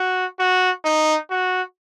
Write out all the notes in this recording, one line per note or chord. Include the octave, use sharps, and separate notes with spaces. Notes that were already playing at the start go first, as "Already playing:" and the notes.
Already playing: F#4
F#4
D#4
F#4